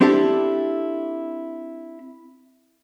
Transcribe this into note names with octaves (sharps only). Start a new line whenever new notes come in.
C4 D4 E4 G4 A4